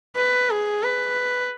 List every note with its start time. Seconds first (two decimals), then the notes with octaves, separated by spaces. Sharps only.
0.16 B4
0.50 G#4
0.83 B4